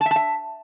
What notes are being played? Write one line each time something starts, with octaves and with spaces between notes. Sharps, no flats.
A5
E5
A5
E5